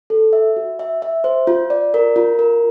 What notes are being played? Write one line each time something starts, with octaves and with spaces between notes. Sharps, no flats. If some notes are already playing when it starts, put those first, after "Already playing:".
A4
E5
F#4
E5
E5
C5
F4
D5
A#4
F4
A#4